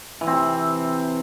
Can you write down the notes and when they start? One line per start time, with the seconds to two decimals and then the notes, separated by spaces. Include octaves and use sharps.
0.21 E3
0.27 C4
0.33 C3